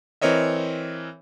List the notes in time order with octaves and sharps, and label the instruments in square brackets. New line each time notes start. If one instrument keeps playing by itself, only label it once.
[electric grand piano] E3 C4 A#4 C#5 D#5 E5